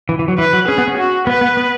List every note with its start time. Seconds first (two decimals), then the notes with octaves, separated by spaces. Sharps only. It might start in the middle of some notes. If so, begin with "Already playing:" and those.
0.09 E3
0.19 E3
0.28 F#3
0.38 E3 B4
0.53 F#3
0.68 C#4 G#4
0.78 B3
0.88 C#4
0.98 F#4
1.27 B3 B4
1.41 B3
1.57 B3